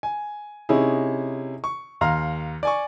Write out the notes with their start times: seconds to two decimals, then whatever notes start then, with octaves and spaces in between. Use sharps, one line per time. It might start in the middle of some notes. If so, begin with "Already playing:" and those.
0.03 G#5
0.69 C3 C#4 D#4 E4 G#4
1.64 C#6
2.01 D#2 F5 A#5 C6 F6
2.63 D5 G#5 C#6